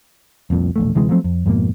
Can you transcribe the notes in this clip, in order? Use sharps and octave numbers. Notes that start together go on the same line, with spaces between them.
F1 C2 F2 A#2
E1 A#1 A3
D2 C3 E3 G#3
F3 F#3 A3 C4
F2
F2 G#2 B2 A#3